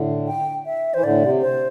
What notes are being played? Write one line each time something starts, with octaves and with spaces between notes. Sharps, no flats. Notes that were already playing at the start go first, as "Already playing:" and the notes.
Already playing: A2 D3
G5
E5
E3 C5
A2 D3 D5
C3
C5